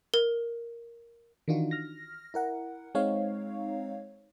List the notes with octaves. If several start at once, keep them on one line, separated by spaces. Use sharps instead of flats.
A#4
D#3 E3 D4 D#4 F4 F#4
F6 A#6
E4 A#4 F#5
G#3 C4 D#4 C#5 F5